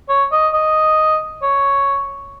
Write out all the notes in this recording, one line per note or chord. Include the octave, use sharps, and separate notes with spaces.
C#5
D#5
D#5
C#5